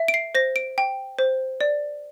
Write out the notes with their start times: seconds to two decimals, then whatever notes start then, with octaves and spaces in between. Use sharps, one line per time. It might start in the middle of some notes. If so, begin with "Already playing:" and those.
Already playing: E5
0.08 D7
0.14 C7
0.35 C5 A#6
0.56 D7
0.78 G5
1.19 C5
1.61 D5